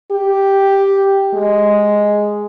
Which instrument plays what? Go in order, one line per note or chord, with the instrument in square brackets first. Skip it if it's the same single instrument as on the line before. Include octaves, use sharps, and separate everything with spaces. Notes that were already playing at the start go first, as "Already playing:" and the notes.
[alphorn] G4
G#3